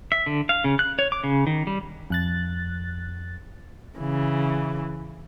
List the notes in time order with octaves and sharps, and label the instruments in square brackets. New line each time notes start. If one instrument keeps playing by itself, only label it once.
[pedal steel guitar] E5
D3
F5
C#3
F#6
C#5
D6
C#3
D#3
G3
[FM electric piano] F2 F#6 A6
[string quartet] C#3 E3